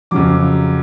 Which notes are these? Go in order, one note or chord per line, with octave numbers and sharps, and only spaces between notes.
F2 C#3 F#3 D6